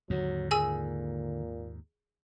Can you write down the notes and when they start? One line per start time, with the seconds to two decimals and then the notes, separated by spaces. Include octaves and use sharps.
0.10 D#2 G#2 D3 F#3
0.51 A#2 G#4 G#5 E6